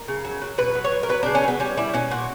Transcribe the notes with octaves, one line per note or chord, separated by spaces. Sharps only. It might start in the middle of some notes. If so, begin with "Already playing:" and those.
Already playing: A#4
C#3
F#3
F#3
B2 B4
F#3
C#5
B2
A#4
F#3 B4
C#3 D4
C#4
F#3 B3
G3 C#4
G3 E4
B2 C#4
A#2 F#4